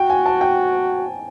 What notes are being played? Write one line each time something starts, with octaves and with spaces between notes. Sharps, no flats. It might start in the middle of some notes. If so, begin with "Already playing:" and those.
Already playing: F#4 G5
G#5
A5
G5